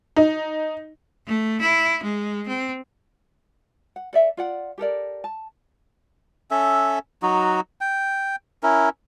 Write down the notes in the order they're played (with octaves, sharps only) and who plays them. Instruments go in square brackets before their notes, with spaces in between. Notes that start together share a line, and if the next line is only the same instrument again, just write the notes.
[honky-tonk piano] D#4
[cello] A3
E4
G#3
C4
[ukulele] F#5
A4 D5 E5
F4 D5 F#5
G4 A4 A#4 D5
A5
[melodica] C#4 A4 E5
F#3 D#4 F#4
G5
C#4 E4 A#4